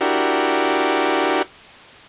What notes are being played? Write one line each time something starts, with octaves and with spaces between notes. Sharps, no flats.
D4 E4 F#4 G4 A#4